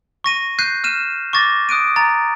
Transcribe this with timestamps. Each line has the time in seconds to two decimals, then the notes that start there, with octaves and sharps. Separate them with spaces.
0.24 C#6 A#6 D#7
0.59 F#6 G6 C7 D#7
0.84 F6 D#7 E7
1.33 C#6 D6 A6 A#6
1.69 D#6 F#6 D7 D#7
1.96 A#5 A6